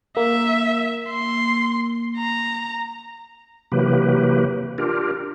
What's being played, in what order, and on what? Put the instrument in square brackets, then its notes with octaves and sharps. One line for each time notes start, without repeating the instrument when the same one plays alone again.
[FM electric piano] A#3 [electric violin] E5
[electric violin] C6
A#5
[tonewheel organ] C3 E3 F#3 A#3 G4 B4
D4 F4 G4 A#4